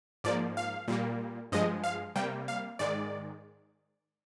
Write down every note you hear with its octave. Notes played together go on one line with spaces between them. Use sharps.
G#2 F3 A#3 D5
F5
A#2 G3 A#3
G2 F3 G#3 D#5
F5
C3 G3 A#3 G5
F5
G#2 D#3 G#3 D5